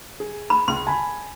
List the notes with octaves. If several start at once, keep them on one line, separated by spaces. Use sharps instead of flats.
G#4
B5
C#2 C6
G#5 A5 B5